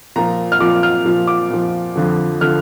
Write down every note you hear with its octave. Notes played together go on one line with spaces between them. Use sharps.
A#2 F3 A#5
F6
A#2 F3 D6
F6
A#2 F3
D6
A#2 F3
F2 D3 F3
D3 F3 F6